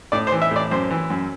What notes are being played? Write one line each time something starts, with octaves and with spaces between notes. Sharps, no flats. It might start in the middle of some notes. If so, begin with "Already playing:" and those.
A2 D5
C5
E3
E5
A2 D5
F#2 C5
E3
F#2